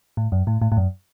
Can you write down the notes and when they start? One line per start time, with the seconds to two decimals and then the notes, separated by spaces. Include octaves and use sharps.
0.17 A2
0.32 F#2
0.47 A2
0.62 A2
0.72 A2
0.77 F#2